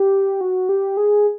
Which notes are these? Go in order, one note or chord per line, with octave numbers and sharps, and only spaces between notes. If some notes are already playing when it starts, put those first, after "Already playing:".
Already playing: G4
F#4
G4
G#4